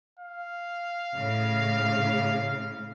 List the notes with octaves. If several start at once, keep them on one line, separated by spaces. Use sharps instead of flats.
F5
A2 C#3